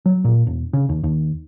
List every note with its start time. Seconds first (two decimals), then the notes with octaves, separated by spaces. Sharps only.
0.06 F#3
0.24 A#2
0.47 E1
0.73 C#3
0.89 D#2
1.03 D#2